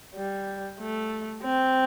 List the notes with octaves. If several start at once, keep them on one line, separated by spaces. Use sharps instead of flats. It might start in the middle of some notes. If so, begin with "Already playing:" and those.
G3
A3
C4